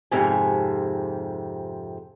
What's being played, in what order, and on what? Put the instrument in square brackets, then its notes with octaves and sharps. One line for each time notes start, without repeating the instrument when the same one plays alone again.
[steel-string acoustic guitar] F2 G#2 C3 G#5